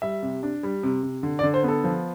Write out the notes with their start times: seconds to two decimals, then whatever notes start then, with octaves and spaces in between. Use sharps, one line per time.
0.02 G3 E5
0.23 C3
0.43 D4
0.63 G3
0.83 C3
1.03 C3
1.23 D3
1.39 D5
1.43 D3
1.54 C5
1.63 B3 A4
1.84 F3